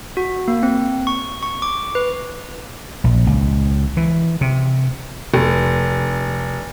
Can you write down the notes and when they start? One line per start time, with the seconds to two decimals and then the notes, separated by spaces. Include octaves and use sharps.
0.17 F#4
0.48 A#3
0.63 C4
1.07 C#6
1.43 C#6
1.62 D6
1.95 B4
3.04 A#1
3.27 C#2
3.97 E3
4.41 C3
5.34 F1